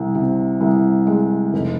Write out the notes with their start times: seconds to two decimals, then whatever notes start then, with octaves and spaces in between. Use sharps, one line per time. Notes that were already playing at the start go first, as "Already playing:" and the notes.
Already playing: C2
0.15 C3
0.61 C2
1.07 G#3
1.53 F1